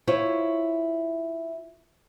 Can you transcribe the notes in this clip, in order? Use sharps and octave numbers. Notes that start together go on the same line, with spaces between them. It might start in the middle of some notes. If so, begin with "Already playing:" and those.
E4 F4 C5 C#5